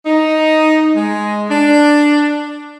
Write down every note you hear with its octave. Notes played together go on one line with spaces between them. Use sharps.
D#4
G#3
D4